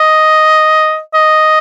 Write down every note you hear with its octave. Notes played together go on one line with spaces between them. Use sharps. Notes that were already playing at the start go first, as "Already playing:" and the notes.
Already playing: D#5
D#5